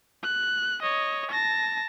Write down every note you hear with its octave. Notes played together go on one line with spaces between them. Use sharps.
F#6
C#5 D#5
A5 A#6